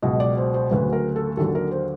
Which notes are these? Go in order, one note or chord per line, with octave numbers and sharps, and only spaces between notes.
C#2 B2 F#3 D#5
D5
C5
C5
D2 C#3 F#3 B4
A#4
A4
D#2 D3 F#3 A4
A#4
C5